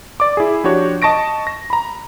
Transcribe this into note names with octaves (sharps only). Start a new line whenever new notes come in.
D5 D6
E4 G#4
F3 D4 F#4 G4 C#5
D#5 A5 C#6 A#6 D7
A#6
A#5 B5